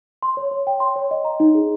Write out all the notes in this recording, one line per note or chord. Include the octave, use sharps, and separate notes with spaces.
C6
C#5
C#5
G5
C6
C#5
D#5
A#5
D#4
G#4